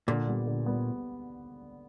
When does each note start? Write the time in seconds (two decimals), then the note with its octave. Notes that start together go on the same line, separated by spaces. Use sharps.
0.08 A#2 D3
0.27 G3 B3
0.47 D3
0.66 G3 B3